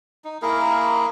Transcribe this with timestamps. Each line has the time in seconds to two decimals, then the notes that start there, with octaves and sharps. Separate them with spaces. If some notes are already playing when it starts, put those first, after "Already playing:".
0.24 D#4
0.42 A#3 E4 G#4 A#4